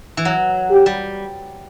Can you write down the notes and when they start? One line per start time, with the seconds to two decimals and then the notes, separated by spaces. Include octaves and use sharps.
0.17 E3
0.25 F#3
0.71 G4
0.86 G3